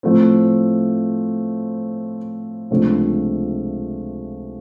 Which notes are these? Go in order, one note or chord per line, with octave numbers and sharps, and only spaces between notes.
A2 F3 A3 C4
C#2 C3 F3 A3 D4